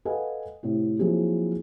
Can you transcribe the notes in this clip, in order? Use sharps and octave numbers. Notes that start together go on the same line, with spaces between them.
A4 B4 D#5 F5 F#5 G#5
A2 C3 E4
F3 F#3 A#3 C4 E4 G#4